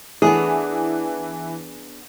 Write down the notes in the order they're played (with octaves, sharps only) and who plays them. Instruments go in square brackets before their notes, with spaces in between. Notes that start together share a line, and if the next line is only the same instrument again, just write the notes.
[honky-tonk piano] E3 [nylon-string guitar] B3 D4 G#4